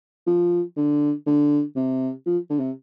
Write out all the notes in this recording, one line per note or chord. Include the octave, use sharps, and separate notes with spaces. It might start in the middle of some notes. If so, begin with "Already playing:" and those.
F3
D3
D3
C3
F3
D3
C3